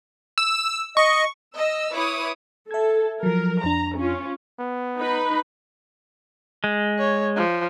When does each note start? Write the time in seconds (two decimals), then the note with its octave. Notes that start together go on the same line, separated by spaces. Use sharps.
0.38 E6
0.97 D#5 C#6
1.55 D#5 E6
1.91 E4 B4 C#5 D6 D#6
2.71 A4 E5 G#6
3.23 F3 F#3 A#4
3.64 F2 D4 A#5
3.97 C#4 F4
4.59 B3
4.98 D#4 B4 B5
6.64 G#3
6.99 C#5
7.36 F3